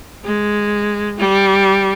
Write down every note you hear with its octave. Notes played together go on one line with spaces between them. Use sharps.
G#3
G3